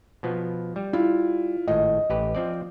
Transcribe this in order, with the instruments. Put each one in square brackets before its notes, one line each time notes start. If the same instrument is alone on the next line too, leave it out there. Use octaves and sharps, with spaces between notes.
[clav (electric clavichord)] B2 F3 B3
G3
[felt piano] E4 F4
[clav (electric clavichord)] G#1 A2 [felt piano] D#5
[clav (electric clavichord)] A1 G4 B4
F3 C4 D5